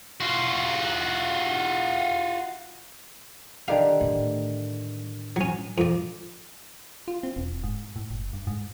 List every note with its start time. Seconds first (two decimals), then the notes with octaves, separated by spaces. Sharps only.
0.20 F4 F#4
3.68 D3 D#3 G4 F5
4.01 A2
5.36 F#3 C#4
5.78 F2 D5
7.08 F4
7.23 C4
7.36 E1
7.63 G#2
7.96 A2
8.11 F#1
8.33 G2
8.47 G#2